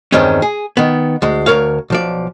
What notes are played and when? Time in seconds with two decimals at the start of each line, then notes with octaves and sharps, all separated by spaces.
0.12 E2 G2 D#3 G#3 C4 C#4
0.42 G#4
0.77 D#3 B3
1.22 D2 G#3
1.46 D2 C3 A#4 C#5 F5
1.90 B1 F3 D5